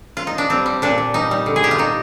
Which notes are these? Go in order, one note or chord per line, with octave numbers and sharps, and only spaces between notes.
F4
D#4
D4
G3 C4
G3
A#2 D4
A#2
G3 D#4
G3
D3
G#4
G3 G4
F4
G3 D#4